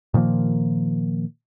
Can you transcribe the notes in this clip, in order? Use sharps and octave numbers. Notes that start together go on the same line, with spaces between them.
A#2 D#3 F3 A#3